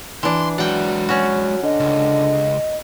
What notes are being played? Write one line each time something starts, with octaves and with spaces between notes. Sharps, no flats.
E3 D4 C6
F#3 G#3 D5 F#5 G5
C#4 F#4
D3 D#5
C#2